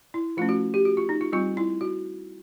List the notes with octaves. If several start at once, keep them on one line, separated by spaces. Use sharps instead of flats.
E4
F3 A3 C#4 F4
F#4
G4
F#4
F4
D#4
F4
G3 C4 F4
E4
F#4